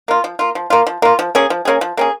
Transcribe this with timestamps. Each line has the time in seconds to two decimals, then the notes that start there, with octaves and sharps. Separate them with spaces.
0.08 A#3 F4
0.24 F3
0.39 A#3 F4
0.55 F3
0.70 A#3 F4
0.87 F3
1.02 A#3 F4
1.19 F3
1.35 A#3 C#4 G#4
1.50 F3
1.65 A#3 C#4 G#4
1.81 F3
1.97 A#3 C#4 G#4